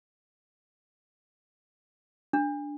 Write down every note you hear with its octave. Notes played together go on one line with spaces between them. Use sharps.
D4